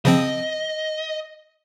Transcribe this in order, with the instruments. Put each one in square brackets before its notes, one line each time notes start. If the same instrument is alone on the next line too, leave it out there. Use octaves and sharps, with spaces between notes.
[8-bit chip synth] C#3 F3 C4 [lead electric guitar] D#5